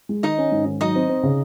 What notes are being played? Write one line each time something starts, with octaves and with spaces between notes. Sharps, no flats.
G#3
D#3 D#4 D#5
C#4
G#2
D#3
F#3 D#4 D#5
C4
C4
C#3